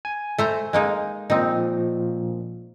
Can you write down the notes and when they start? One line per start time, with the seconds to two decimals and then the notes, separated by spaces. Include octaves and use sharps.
0.05 G#5
0.38 A3 C5 A#5
0.73 G#3 A#3 D#4
1.30 A#2 F3 C4 D#4